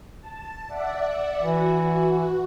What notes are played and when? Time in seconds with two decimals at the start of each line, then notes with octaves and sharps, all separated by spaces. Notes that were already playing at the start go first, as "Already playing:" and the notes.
0.20 A5
0.67 D5 E5 F#5
1.41 E3 F#4